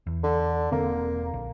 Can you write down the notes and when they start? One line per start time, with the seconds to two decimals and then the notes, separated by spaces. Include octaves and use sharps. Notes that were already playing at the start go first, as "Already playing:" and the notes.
0.07 E2
0.23 D3
0.72 E1 D3 A#3 C4
1.34 A#1